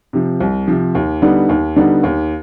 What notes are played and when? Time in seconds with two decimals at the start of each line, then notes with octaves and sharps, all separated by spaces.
0.13 C3 F3
0.40 C2
0.68 C3 F3
0.95 D#2
1.22 D3 G3 B3 D#4
1.49 D#2
1.76 D3 G3 B3 D#4
2.03 D#2